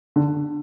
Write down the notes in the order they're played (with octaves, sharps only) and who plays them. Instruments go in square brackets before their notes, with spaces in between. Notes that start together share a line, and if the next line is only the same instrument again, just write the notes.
[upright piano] D3